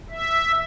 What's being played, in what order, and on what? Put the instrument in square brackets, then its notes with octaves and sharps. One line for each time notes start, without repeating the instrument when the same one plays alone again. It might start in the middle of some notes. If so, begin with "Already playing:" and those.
[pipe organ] E5